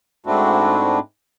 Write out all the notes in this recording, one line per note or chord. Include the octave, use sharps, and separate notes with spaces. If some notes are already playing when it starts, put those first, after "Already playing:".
G#2 A3 C4 D4 E4 F#4